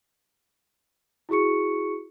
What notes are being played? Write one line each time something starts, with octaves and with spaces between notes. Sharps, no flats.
E4 F#4 G#4 C#6 C#7